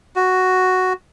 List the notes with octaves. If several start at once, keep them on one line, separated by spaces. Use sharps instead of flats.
F#4